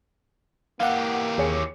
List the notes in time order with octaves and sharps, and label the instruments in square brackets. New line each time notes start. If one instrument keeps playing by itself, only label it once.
[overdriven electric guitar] E3 G4 [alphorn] A#3 [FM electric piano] F5 F#5
[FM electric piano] D#2 [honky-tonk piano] G#4 C#5 C#7